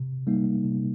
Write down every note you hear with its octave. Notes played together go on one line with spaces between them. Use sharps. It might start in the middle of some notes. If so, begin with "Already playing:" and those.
Already playing: C3
G3 A#3 D#4
C3